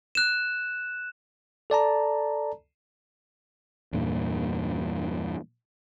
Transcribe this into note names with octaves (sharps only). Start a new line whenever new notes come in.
F#6 E7
A4 D5 A5 A#5
E2 G2 A#2